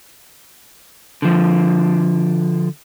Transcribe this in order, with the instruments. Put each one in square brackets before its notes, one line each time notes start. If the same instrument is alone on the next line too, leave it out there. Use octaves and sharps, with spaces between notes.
[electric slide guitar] D3 F3